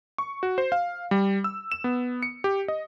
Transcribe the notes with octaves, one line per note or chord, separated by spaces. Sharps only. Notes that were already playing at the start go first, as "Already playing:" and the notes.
C#6
F#4
C5
F5
G3
E6
E7
B3
C#7
G4
D#5